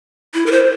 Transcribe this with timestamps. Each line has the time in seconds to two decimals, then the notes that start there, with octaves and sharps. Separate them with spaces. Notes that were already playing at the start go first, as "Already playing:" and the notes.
0.34 E4
0.46 A#4
0.52 C5